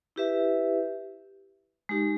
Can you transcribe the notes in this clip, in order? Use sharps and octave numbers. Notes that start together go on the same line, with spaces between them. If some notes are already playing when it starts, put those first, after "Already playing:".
E4 G4 B4 E5
G#3 D#4 G4